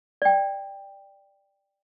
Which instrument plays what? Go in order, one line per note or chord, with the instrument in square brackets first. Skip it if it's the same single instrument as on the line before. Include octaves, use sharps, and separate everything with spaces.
[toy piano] D5 G5